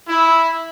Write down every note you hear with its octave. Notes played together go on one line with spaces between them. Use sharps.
E4